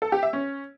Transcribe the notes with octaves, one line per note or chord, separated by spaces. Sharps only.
A4
G4
E5
C#4